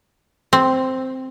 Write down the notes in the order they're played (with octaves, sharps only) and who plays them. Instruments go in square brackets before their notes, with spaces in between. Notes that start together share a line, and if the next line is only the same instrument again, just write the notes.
[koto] C4